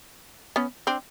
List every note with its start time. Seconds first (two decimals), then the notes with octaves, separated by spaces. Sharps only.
0.56 B3 C#4
0.87 C4 D4